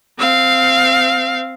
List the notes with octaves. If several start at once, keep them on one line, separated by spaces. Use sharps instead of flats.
C4 F5